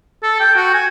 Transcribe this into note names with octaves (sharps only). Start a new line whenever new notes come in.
A4
G5
F#4
G#5